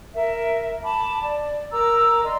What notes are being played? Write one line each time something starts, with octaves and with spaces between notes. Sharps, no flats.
A#4 E5
A5 B5 D6
D5
A#4 A#5 D6 E6
D5 D#5 C6